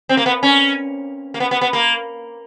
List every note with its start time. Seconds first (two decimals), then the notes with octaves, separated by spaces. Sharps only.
0.09 C4
0.17 A#3
0.26 B3
0.43 C#4
1.34 A#3
1.40 B3
1.51 B3
1.61 B3
1.73 A#3